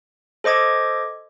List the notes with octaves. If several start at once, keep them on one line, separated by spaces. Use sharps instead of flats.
A4 C5 D#5 D6 G#6